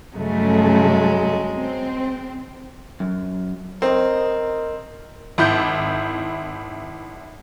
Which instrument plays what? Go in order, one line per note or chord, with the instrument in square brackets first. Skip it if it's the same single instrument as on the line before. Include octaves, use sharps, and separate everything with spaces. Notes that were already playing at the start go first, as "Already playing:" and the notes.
[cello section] G2 C#3 A3 [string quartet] F#3 G#3
[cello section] C4
[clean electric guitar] F#2
[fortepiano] C4 [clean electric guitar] A#4 D#5
[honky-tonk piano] G#1 E4 G6